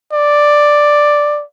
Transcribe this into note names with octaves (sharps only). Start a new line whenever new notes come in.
D5